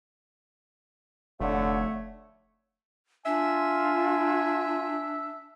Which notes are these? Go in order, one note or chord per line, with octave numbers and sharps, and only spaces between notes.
F1 D3 A3 C#5 F5 F#5
D4 F4 E5 G#5